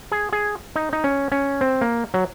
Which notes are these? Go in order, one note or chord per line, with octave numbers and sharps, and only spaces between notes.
G#4
G#4
D#4
D#4
C#4
C#4
C4
A#3
F#3